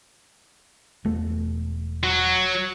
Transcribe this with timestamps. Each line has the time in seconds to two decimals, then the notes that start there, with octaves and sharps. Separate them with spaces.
1.05 E1 A3
2.04 F#3